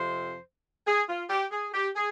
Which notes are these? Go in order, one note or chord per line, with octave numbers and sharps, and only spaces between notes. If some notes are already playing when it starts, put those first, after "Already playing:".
Already playing: F2 C3 F3 C5
G#4
F4
G4
G#4
G4
G#4